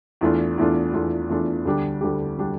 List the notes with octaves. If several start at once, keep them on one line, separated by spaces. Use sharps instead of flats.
E2 E3 A3 D4 F4
E2 E3 A3 D4 F4
E2 E3 A3 D4 F4
E2 E3 A3 D4 F4
D2 D3 G3 D4 G4
D2 D3 G3 D4 G4
D3 G3 D4 G4